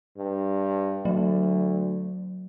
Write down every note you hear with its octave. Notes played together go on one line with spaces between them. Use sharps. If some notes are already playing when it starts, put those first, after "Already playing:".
G2
D2 F#3